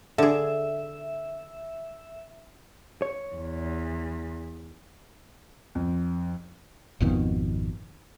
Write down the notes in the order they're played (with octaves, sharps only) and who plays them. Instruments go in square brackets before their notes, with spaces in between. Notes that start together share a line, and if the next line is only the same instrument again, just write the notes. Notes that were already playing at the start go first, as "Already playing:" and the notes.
[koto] D3 G#4 [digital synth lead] E5
[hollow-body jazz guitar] C#5
[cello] E2
[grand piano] F2
[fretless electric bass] G#1 F2 B2 D#3